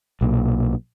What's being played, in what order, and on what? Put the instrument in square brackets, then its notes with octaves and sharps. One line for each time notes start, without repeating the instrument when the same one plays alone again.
[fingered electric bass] B1 A#2